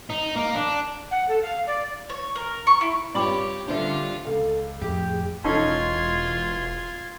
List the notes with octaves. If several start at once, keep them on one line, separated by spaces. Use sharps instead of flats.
D#4
A#3
D4
F#5
A4
F5
D5
C#5
A#4
C#6
E4
G2 F4 G4 C#5 D5 G5 B5 D6
D3 G3 D4 F4 C5 E5
C#2 A4 F5
F2 A2 G4 G#4
E1 C#4 D#4 F4 A4 C6 G#6